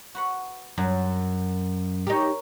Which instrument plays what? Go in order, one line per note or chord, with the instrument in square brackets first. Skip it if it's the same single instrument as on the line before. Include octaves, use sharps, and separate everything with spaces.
[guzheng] F#4 B4 F#5
[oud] F#2 [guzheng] F#3
[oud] D#4 G4 [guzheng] A#4 C#5